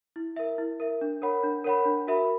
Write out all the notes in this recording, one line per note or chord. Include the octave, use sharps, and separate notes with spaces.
E4
A#4 E5
E4
A#4 E5
D4
A#4 C#5 F#5 B5
D4
A#4 C#5 F#5 B5
D4
F#4 A#4 E5 B5